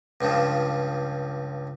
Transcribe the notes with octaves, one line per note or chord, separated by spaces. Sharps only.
C#2 G2 C#3 F3